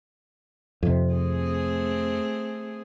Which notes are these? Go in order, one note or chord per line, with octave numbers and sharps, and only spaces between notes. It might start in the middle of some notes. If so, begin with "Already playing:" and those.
F2 C3
A3 C4 G#4